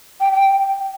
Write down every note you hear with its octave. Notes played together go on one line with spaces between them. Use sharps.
G5
G5